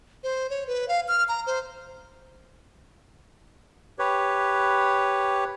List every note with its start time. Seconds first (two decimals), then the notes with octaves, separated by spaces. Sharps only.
0.24 C5
0.50 C#5
0.67 B4
0.88 F5
1.08 F6
1.29 A#5
1.46 C5
3.99 G4 B4 C#5